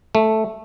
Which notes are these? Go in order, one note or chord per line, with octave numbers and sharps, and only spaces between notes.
A3